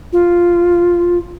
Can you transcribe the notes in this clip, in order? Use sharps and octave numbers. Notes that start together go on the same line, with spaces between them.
F4